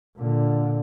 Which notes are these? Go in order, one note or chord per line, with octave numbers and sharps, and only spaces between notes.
A#2 D3